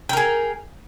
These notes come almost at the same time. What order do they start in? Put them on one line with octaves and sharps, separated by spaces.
G5 A#4 G#4